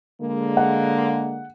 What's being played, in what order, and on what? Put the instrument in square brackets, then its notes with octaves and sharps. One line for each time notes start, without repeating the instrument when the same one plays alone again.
[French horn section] D3 G#3 A#3
[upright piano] F#5